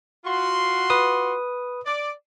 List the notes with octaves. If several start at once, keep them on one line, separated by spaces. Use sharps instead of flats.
F4 F#4 C6
B4 D#6
D5